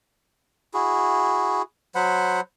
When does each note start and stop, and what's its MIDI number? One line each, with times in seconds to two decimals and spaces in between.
0.74 1.62 64
0.74 1.62 66
0.74 1.62 68
1.95 2.41 54
1.95 2.41 72
1.95 2.41 78
1.95 2.41 83